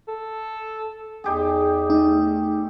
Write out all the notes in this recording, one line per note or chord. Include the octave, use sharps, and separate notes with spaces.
A4
E2 D#4 G4 G#4
A3 D#4 D#5